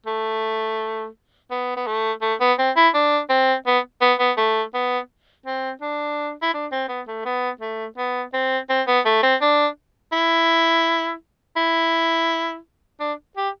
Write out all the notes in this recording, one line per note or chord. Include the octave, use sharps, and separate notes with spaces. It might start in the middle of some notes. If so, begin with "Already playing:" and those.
A3
B3
B3
A3
A3
B3
C4
E4
D4
C4
B3
B3
B3
A3
B3
C4
D4
E4
D4
C4
B3
A3
B3
A3
B3
C4
C4
B3
A3
C4
D4
E4
E4
D4
G4